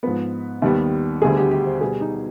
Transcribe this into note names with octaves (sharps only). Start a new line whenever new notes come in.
G#2 F3 B3 B4
D#2 D#3 G3 B3
D2 D3 G3 B3 G#4
G4
G4
C5
B2 G3 B3 G#4
D#4